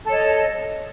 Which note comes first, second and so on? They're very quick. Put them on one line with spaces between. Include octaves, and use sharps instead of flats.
A4 C#5 D#5